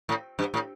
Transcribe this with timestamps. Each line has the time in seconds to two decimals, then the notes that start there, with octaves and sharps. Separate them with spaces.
0.09 A2
0.39 G2
0.54 A2